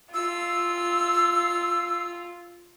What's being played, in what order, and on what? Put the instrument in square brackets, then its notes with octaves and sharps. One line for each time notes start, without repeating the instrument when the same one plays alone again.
[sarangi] F4 [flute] E6